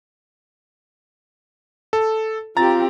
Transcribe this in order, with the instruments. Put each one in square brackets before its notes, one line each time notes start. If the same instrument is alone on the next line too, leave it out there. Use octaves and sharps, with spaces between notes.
[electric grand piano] A4
[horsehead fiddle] C4 G4 [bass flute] F4 [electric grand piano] A#5 A6